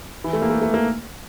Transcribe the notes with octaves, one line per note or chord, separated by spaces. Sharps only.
E3
A3
A#3
A3
A3
A#3